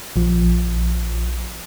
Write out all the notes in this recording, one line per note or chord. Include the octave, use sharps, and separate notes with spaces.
A#1 F3